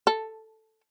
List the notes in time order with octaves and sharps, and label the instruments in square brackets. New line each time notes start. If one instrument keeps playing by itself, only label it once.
[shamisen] A4